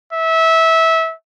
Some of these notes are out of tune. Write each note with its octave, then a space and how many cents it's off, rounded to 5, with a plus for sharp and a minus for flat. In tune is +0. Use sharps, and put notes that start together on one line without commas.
E5 -20